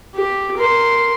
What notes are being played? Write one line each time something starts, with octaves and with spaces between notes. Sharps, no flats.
G4
A#4 C6